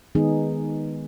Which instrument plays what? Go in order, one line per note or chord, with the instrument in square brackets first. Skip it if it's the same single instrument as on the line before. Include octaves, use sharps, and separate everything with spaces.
[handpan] D#3 G#3 B3 D#4 G#4